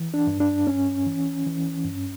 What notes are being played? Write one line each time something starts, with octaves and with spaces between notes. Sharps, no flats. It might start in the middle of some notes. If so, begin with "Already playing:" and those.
Already playing: E3
D4
G2
D4
G2 C#4
E3
E3
G2